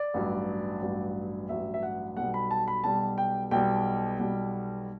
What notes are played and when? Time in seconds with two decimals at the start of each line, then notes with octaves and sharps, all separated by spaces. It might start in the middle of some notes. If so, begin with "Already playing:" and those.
Already playing: D5
0.14 A1 G2 F#3
0.82 A1 G2 F#3
1.49 A1 G2 F#3 E5
1.74 E5
1.83 F#5
2.17 B1 B2 G3 F#5
2.34 B5
2.51 A5
2.68 B5
2.84 B1 B2 G3 A5
3.18 G5
3.51 B1 B2 G3 G5
4.19 B1 B2 G3